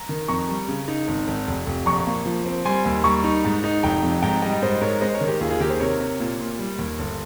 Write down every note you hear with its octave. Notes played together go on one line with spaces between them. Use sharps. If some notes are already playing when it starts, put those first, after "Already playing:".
Already playing: A#5
D#3
F2 A#5 C#6
G3
C#3
D#4
G#1
G#1
F1
F1
A#1 A#5 C#6
A#3
F3
C4
G3 G#5 C6
D#2
G3 A#5 C#6
D#4
G#2
D#4
F1 G5 A#5
F2
G#2 G5 A#5
G3 D#5 G5
G#2 C5 D#5
G#2 A#4 C#5
G#3 C5 D#5
A#4 C#5
D#3
G4
D#2 F4 G#4
F4 G#4
D#3 G4 A#4
G#4 C5
C3 A#4 C#5
C3
A#2
A#2
G3
D#2
G1